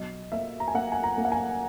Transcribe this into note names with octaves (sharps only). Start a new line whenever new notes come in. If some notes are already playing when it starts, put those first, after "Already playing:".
Already playing: B1 D#5
A#3 E5
A#5
G#5
A#3 F#5
G#5
A#5
A#3
F#5
G#5